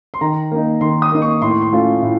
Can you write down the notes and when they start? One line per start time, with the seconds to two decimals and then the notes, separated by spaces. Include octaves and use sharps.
0.14 C6
0.21 D#3 A#5
0.51 A#3 D#4
0.81 D#3 C6
1.02 D#6
1.12 A#3 D#4
1.22 C#6
1.42 A2 C6
1.51 C#6
1.61 C6
1.73 A3 C#4 F4
2.02 A2